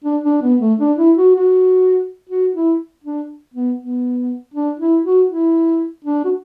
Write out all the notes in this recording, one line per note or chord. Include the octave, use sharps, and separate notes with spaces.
D4
D4
B3
A3
D4
E4
F#4
F#4
F#4
E4
D4
B3
B3
D4
E4
F#4
E4
D4
F#4